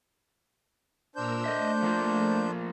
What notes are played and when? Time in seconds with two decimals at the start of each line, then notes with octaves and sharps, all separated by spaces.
1.16 A#2 D4 A#4 C5 E6 G6
1.45 A3 D#5 E5
1.82 F3 A#3 F4